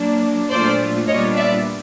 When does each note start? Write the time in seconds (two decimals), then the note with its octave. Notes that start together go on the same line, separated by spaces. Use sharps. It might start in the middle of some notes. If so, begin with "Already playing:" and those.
Already playing: F#3 A#3 D4
0.49 A#2 F#3 A3 D4 F4 C5 D5
1.08 A#2 G3 B3 D4 F4 C#5 D#5
1.36 D5 E5